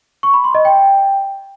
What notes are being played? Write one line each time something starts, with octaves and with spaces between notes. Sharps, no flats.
C#6
B5
C6
D#5
G5